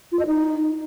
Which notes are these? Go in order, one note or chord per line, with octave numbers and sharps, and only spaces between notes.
F4
D#5
D#4